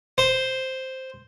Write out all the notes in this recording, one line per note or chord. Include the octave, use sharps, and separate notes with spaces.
C5